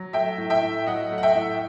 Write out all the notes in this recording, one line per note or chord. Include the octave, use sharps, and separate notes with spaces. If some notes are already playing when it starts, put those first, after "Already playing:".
Already playing: F#3
A3 E5 G5
A2
E5 G5
A2
F#3 D#5 F#5
A3
F#5
E5 G5
A2